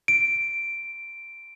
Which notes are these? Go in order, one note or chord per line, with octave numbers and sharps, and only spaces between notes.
D7